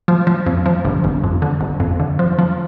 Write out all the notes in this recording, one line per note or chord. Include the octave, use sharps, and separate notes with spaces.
F3
F3
F2
F3
G1
G1
F2
D3
G1
F2
D3
F3
F3